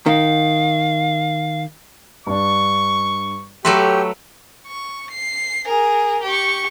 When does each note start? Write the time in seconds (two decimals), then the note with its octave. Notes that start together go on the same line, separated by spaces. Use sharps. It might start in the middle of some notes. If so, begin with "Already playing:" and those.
0.06 D#3 F5
2.27 G2 D4 C#6
3.65 F#3 A3 G4 B4 C6 E6 A#6
4.67 C#6
5.11 C7
5.67 G#4 A#4
6.23 G4 C#6